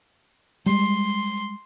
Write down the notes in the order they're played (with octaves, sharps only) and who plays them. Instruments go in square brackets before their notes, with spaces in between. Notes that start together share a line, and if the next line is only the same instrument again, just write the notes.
[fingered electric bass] G3 G#3 [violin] C6